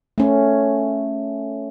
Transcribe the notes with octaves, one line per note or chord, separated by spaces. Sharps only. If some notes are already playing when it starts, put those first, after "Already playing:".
A3 C#4